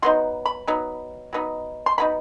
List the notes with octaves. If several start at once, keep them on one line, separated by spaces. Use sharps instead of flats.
F#3 B3 D#4 C6
B5
F#3 B3 D#4
F#3 B3 D#4
C6
F#3 B3 D#4 B5